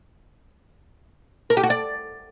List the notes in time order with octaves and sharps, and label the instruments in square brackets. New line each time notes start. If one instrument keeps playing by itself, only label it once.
[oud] A#4
G4
F#4
D5